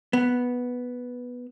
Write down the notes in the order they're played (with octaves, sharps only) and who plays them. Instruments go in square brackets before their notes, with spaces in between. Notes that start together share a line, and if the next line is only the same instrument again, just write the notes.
[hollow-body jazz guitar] B3